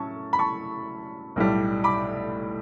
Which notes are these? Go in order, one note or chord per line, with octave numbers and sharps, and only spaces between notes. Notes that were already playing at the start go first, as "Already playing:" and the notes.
Already playing: A2 F#3 C#4 A5 C#6
B5
A5 C#6
B1 A2 G3
B5 D6